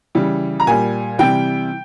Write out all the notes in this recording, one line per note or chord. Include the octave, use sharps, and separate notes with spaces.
C#3 E3 G3
A#5
A#2 G3 G#5
C3 E3 G3 G5